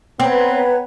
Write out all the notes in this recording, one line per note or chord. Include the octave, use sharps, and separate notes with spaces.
B3 C4 B4 C#5 A#5